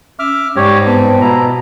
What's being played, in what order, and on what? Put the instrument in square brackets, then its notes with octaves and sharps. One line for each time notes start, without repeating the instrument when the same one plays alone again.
[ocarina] C#4 [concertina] E5 D6 F6
[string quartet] G#2 G3 [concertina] G4 C#5 [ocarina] D5
[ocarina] B3 [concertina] C4 [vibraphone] B4 A5
[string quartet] B2 [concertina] E4 A#5